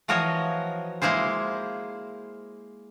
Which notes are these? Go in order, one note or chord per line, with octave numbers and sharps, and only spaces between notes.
E3 F3 F#4 A#4 C#5 D#5
G#3 A#3 E4 G#4 C5